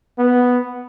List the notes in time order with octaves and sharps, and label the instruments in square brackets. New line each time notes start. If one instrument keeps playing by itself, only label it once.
[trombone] B3